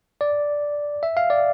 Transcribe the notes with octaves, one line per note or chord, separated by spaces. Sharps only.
D5
E5
F5
D5